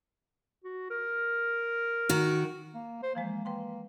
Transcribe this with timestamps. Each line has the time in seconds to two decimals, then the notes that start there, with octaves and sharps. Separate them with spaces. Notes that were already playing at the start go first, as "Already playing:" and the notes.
0.64 F#4
0.90 A#4
2.09 D#3 F#4
2.74 A#3
3.03 C5
3.15 E3 F3 G#3 A#3
3.45 A#3 B4 G5 C6